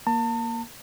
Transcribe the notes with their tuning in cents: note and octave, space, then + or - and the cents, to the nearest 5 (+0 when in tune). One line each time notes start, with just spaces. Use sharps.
A#3 +5 A5 +40